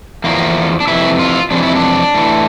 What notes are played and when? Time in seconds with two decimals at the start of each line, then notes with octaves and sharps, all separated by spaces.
0.24 E2 D3 F3 A#3
0.80 D4
0.87 F2 C3 E3 E4
1.19 F4
1.51 F2 C3 E3 D4
1.63 E4
1.75 D4
2.14 A2 E3